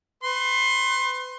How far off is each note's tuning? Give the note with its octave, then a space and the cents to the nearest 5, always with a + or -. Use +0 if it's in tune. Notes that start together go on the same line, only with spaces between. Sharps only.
B4 +35 C6 +25